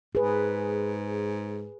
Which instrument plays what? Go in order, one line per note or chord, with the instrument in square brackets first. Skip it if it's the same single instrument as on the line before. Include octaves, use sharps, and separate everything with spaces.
[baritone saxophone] G#2 [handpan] G#4 B4